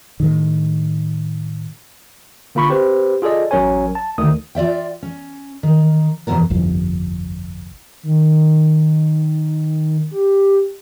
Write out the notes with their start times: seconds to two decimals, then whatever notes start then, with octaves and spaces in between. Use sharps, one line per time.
0.20 A2 D#3
2.55 D3 A#3 F4 B5 C#6
2.69 C4 G4 B4 C5
3.22 F4 G#4 A4 D5 D#5
3.51 A1 F#3 C#4 A#4 C#5 G#5
3.95 A5
4.18 D2 D#3 A3 D#6
4.55 F4 D5 E5 G5
5.03 C#4
5.63 D#3
6.27 F#2 C3 E3 B3 A#4
6.50 G1 C2 F2
8.03 D#3
10.11 G4